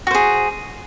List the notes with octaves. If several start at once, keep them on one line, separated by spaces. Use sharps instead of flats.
F#4 G#4 C5